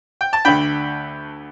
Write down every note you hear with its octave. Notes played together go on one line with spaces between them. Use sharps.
G5
A5
D2 D3 G5 B5